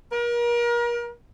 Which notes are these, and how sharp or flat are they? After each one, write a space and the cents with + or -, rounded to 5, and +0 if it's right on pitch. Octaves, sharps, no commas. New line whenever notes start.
A#4 +35